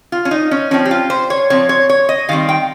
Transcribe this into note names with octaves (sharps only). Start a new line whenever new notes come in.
F4
C#4
D#4
C#4
F3 C4 C#4
G4
F4
C5
C#5
F3 C4 C#5
C#5
C#5
D#5
D#3 G3 C4 F5
G5